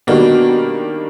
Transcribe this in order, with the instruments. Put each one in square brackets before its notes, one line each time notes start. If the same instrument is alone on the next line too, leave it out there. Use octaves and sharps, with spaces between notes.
[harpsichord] B2 [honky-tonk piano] D#3 G3 A#3 D4